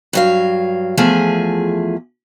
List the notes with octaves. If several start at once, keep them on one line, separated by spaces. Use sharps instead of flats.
G2 F#3 F5
E2 F3 A3 G#4 G#5